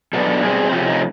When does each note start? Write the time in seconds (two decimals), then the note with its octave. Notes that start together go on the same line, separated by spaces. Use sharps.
0.13 B2 F#3 B3 D4 A4
0.42 B2 G3 C4 G#4
0.71 C3 F3 A3 C#4 G4
0.86 D#4